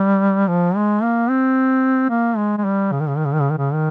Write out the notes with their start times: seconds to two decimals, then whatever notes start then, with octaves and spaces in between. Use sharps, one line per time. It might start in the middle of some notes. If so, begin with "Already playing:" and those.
Already playing: G3
0.47 F3
0.76 G#3
1.02 A#3
1.29 C4
2.10 A#3
2.37 G#3
2.57 G#3
2.64 G3
2.92 C#3
3.00 D#3
3.08 C#3
3.17 D#3
3.25 C#3
3.33 D#3
3.40 C#3
3.50 D#3
3.58 C#3
3.73 D#3